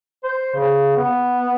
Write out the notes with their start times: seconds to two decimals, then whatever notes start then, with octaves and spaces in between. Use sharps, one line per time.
0.24 C5
0.55 C#3
0.97 B3